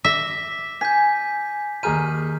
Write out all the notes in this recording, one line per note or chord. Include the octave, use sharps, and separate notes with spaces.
E5 D6 A#6 B6
G#5 G6 B6
D#2 G#4 A#5 F6 G6 D#7